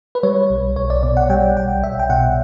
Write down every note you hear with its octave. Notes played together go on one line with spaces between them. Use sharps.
B4
G3 C#5
B1
B1 C#5
D5
B2 D5
F#5
G3 G5
B1 G5
B1 E5
G5
B2 F#5